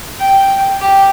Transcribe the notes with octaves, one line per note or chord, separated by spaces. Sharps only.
G5
G4